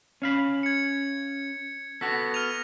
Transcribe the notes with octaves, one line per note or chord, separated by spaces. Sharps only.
C#4 F5 B5
G#6 C#7
B3 F#4 A4 A#6 B6
F6 D#7 F7